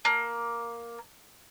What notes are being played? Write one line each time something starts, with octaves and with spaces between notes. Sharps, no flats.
A#3